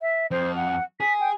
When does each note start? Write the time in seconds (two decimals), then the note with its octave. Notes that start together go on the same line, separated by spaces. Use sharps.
0.01 E5
0.31 F2 C5
0.55 F#5
1.00 G#4 B6
1.20 G5